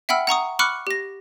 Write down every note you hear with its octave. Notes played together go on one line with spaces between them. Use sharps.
E5 F#5 G5 B5 E6 F6
F#5 A#5 C#6 D#6
B5 C#6 D6 F6 F#6 C#7
G4 A#6